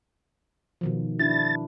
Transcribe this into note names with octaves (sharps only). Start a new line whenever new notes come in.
B2 D#3 F3
D4 E4 A6